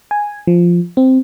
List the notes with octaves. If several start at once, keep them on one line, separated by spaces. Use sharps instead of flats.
G#5
F3
C4